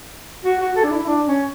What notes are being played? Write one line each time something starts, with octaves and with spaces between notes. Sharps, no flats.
F#4
F#4
A4
D4
E4
D4
C#4